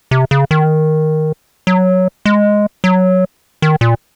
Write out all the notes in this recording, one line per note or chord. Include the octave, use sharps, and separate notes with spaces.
C3
C#3
D#3
F#3
G#3
F#3
D#3
A#2